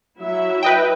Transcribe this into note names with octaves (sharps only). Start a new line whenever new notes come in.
F#3 E4 E5
B4 D#5 G5